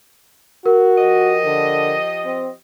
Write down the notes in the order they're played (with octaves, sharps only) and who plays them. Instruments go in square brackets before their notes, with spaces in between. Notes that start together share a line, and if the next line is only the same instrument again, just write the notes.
[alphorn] F#4 [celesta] A#4
[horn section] F3 G4 D#5
[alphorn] D3
C4